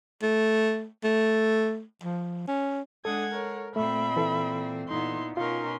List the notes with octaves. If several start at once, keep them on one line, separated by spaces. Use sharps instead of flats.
A3
A3
F3
C#4
G#3 D4 A4 F#5 D#6 G#6
A#4 C#5
A#2 A3 C4 E5 B5
E3 A4
A#2 B3 D#4 E4 C6
B2 C#4 D#4 F4 A#4 C6